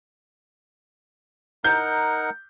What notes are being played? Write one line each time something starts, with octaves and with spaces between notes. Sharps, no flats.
D#4 A#4 F#5 G6